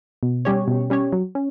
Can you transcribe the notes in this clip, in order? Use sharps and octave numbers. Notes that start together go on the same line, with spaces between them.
B2
G3 C#4 G4 C#5
B2
G3 C#4 G4 C#5
F#3
C#4